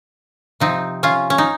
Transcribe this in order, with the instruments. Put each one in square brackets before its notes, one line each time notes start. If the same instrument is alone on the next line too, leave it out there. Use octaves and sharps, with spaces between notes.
[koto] C3 F3 C4 D#4
C#4 F4
C#4
D#4